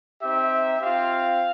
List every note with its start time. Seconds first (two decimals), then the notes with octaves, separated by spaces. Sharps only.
0.22 C4 D#4 G4 E5
0.81 C4 F4 F5